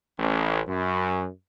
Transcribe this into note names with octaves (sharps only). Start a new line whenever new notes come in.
A1
F#2